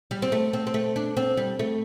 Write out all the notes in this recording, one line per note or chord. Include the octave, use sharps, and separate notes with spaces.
G3
C4
A3
C4
C4
A3
D4
C4
G3
A3